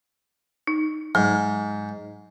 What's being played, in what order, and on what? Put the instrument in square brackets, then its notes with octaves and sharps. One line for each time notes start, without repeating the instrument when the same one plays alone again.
[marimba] D#4
[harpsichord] G#2 [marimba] F#3